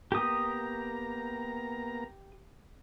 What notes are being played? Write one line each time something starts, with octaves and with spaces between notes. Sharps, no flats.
A#3 B3 G4 A#5 D#6